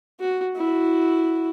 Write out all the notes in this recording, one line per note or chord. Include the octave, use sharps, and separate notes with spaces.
F#4
E4 F#4